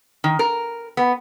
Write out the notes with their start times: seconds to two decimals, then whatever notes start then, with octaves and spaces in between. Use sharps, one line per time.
0.24 D#3
0.39 A#4
0.97 B3